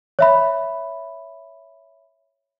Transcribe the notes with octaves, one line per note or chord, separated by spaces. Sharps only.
C#5 E5 B5